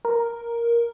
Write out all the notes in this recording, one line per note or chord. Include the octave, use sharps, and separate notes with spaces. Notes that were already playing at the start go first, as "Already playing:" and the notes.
A#4